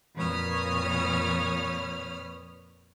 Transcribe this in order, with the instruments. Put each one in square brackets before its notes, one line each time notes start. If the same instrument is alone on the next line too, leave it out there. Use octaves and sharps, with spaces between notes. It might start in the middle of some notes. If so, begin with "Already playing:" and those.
[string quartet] F2 A#2 B4 C#5 D#6 F6